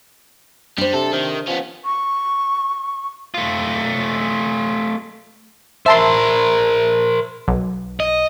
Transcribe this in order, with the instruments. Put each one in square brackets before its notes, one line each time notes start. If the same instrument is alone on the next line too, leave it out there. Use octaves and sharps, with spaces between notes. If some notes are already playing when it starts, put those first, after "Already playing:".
[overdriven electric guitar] G3 [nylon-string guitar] D4 C5
[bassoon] C3 [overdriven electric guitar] A4
[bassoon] C3 [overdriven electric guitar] D#3
[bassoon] F3 [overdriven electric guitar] B3 C#4
[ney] C#6
[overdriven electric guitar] A3 F4
[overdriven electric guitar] A#4 C5 [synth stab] E5 A5 C6
[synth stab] B1
[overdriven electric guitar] D#5